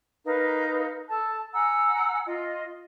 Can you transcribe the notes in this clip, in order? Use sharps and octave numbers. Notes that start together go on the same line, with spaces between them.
D#4 A#4 B4 F5
A4 A5
F#5 G#5 A#5 E6
F4 D#5